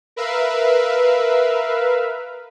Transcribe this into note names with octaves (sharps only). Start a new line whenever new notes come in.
A#4 B4 E5 F5